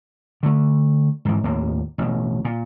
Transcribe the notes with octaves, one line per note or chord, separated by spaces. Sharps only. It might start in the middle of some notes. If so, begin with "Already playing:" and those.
D3 A3
G#2 E3
D#2 A2 A#3
A1 B2
A#2